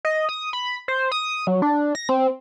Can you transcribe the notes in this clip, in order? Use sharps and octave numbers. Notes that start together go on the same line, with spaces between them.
D#5
D#6
B5
C5
D#6
F#3
D4
A#6
C4